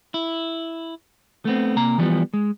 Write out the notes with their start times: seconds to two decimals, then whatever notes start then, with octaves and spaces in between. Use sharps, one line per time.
0.14 E4
1.45 A3 B3 C4
1.76 C3 A#3 A#5
1.98 E3 F3 G3 B3
2.34 G#3